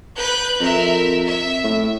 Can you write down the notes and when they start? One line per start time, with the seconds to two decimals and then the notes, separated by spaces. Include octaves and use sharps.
0.17 B4 F#6 G6
0.60 F2 A#4 E5
1.26 E5
1.64 A2